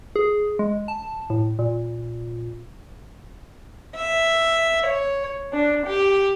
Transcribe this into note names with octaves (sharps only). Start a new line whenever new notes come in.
G#4
G#3
A5
A2
A#2
E5
C#5
D4
G4